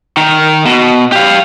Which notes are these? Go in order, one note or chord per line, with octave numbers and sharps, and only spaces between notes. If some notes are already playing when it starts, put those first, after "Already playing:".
D#3 A#4
B2
G4 F5